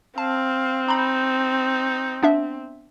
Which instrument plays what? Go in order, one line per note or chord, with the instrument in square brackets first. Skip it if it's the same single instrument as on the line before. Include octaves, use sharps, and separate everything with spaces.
[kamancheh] C4 [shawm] F5 [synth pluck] A5
[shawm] D#4 [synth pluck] A#5 B5
[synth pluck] B3 D4 E5